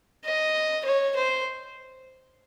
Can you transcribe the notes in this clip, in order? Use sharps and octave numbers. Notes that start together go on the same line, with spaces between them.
D#5
C#5
C5